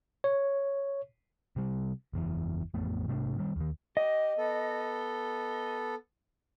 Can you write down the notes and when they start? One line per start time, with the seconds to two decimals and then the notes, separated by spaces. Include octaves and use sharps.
0.24 C#5
1.56 C3 G3
2.13 F#1 E2 E3
2.74 A1 F2 A3 B3
3.08 G#2 C3 A3 D4
3.38 D#3 G3 A#3 C4
3.56 D#2 D#3
3.97 G4 D#5
4.38 B3 A4